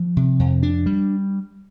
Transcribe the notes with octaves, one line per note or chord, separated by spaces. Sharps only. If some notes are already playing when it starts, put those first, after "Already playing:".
Already playing: F3
C3
F2
D4
G3